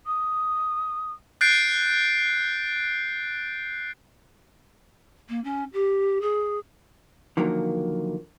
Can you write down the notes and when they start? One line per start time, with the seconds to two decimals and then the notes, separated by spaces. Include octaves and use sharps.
0.06 D#6
1.41 F#6 G6 A6 C7 D7
5.29 A#3
5.44 C#4
5.73 G4
6.21 G#4
7.37 D3 D#3 F3 F#3 A#3